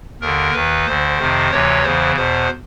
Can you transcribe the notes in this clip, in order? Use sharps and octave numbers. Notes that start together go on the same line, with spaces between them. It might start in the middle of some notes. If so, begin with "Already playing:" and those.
D#2 D3 A#4
D#2 D#3 B4
D2 D3 C5
F2 C3 D#3
D2 C3 E3 C#5
E2 C#3 E3 C5
E2 B2 C5